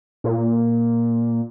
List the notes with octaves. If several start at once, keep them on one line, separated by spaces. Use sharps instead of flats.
A#2